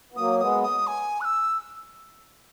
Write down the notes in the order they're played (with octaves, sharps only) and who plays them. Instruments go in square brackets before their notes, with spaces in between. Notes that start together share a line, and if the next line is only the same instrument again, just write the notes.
[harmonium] B3
[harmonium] F#3 A#3 [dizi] D#6
[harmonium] G#3 B3 [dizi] D#6
[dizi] D#6
G#5
F#6
E6